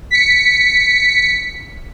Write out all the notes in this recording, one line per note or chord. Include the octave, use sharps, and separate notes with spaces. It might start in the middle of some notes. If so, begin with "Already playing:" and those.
B6 C#7